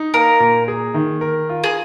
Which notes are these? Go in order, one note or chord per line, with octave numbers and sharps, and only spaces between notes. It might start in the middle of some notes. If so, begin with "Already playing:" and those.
Already playing: D#4
A#3 A#4
A#2
G#4
D#3
A#4
F4
G#4